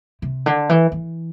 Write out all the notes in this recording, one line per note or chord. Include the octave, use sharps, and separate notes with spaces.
C3
D3
E3
E3